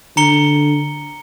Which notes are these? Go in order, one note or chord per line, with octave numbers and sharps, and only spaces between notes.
D3 A#5 C#7 G7